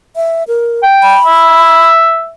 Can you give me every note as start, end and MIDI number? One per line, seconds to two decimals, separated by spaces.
0.16 0.44 76
0.48 0.81 70
0.83 1.18 79
1.03 1.89 83
1.26 2.29 76